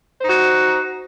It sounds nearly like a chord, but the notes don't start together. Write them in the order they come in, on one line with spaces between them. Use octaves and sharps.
C5 D#4 F#4